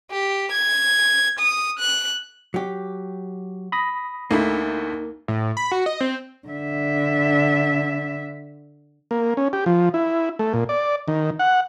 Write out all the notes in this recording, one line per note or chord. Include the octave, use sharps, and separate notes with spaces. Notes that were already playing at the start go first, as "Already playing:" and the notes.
G4
G#6
D#6
F#6
F#3 G4
B5 D#6 A#6
D2 A3 A#3 D#4 E4
A2
B5
F#4
D#5
C4
D3 E5
A#3
C#4
G4
F3
E4
A3
A#2
D5
D#3
F#5